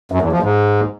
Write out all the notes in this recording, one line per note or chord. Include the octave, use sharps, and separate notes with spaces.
F#2
E2
F3
G#2